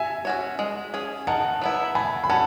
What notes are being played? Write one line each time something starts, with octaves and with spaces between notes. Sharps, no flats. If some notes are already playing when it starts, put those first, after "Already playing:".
Already playing: E5 G#5
C#4 F#4 C#5
G#3
C#4 G#4
D#3 F#5 A5
F#3 B3 E4
A3 G#5 B5
B5
C#4 F#5 A5